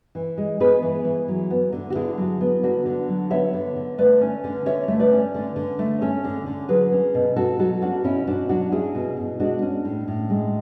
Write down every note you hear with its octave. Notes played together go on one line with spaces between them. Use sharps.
E3
G#3
B3 G#4 B4
E3
E3
F#3
B3
D3
F#4
D3 E4 G#4
F#3
B3
D3 D4 F#4
D3
F#3
B3 C#5 E5
D3
D3
A3 B4 D5
C#4
D3
D3 C#5 E5
A3
B4 D5
C#4
D3
D3
A3
C#4 A4 C#5
D3
D3
F#3 G#4 B4
C#4
B2
B2 F#4 A4
F#3 F#4 A4
C#4 D4 F#4
B2 C#4 E4
B2 D4 F#4
F#3 D4 F#4
C#4 E4 G#4
B2
B2
G#3 D4 F#4
C#4
A2
A2
G#3